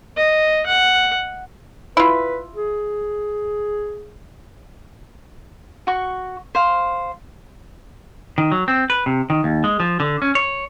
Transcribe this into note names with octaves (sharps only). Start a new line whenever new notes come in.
D#5
F#5
E4 F4 B4
G#4
F#4 C#6
C5 F5
D#3
F#3
C4
B4
C3
D#3
D#2
G#3
F3
D3
C#4
C#5